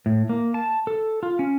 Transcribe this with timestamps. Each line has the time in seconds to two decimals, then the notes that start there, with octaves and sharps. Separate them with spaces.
0.06 A2
0.29 A#3
0.54 A5
0.87 A4
1.23 F4
1.39 C#4